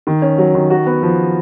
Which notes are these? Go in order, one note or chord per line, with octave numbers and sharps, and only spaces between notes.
D#3
C#4
F#3
D#3
F#4
B3
F3